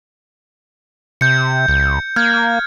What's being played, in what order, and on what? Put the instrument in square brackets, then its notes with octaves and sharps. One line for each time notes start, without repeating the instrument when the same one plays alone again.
[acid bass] C3 [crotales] G6 C#7
[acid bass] C#2
[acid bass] A#3 [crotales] F6 G#6